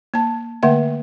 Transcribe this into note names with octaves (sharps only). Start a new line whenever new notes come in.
A#3 A5
D3 A3 A#3 E5 F#5